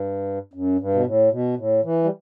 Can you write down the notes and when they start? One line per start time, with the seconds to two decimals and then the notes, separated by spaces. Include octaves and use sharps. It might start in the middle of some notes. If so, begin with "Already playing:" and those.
Already playing: G2
0.54 F#2
0.79 G2
0.94 B2
1.06 A2
1.31 B2
1.57 A2
1.84 E3
2.04 G3